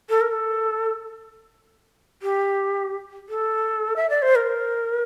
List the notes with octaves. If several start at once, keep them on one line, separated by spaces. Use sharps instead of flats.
A4
A#4
A4
G4
A4
E5
D5
C5
A#4